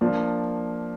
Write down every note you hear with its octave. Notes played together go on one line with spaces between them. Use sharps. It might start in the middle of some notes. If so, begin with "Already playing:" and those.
F3 A#3 D4